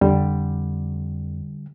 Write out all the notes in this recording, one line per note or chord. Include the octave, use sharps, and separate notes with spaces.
F2 D3 G3